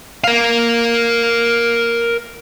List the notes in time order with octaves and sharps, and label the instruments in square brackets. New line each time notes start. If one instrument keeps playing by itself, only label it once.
[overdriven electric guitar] A#4 F5